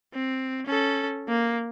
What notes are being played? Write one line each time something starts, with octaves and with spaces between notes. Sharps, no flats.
C4
C#4 A4
A#3